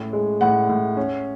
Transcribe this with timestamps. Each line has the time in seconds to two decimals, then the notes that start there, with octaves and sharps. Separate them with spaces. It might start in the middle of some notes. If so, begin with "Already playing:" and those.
Already playing: A2 C#4
0.13 G#3
0.41 A2 F#5
0.69 A2
0.97 C#4